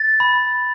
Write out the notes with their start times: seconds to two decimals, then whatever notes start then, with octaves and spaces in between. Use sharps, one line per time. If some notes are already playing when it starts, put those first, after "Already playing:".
Already playing: A6
0.20 B5